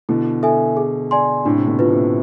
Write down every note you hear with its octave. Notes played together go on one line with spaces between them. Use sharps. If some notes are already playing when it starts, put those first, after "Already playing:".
B2 D3 E4
A4 E5 G#5
G#4
D5 G#5 C6
A2 C3 D4
C3
B2 D3
F4 B4
A2 C3